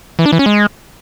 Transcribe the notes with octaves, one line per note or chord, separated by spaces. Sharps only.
E3
D4
E3
C#4
G#3